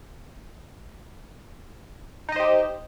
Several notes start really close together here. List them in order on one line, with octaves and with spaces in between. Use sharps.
D#4 D#5 C5 G4